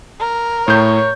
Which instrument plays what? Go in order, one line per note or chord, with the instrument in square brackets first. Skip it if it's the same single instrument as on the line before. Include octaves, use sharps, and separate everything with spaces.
[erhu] A#4
[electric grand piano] A2 G6 [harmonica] C#5